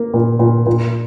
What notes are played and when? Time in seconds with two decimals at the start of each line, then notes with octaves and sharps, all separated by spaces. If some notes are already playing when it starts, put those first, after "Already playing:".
Already playing: A#3
0.14 A#2
0.39 A#2
0.66 A#2